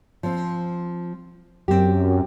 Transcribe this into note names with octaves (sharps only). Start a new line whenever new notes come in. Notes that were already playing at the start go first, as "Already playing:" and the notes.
F3 C4
F#2 C4 G4